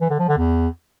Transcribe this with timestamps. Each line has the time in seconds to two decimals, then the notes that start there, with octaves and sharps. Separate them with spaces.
0.01 E3
0.10 D3
0.20 F3
0.29 D3
0.38 E2